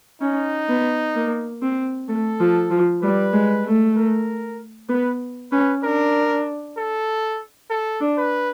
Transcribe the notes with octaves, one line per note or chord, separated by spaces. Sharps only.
C#4 D#4
B3
A#3
C4
A3 A4
F3
F3
G3 B4
G#3
A3
A#4
B3 B4
C#4 B4
D4 A#4
A4
A4
D4
B4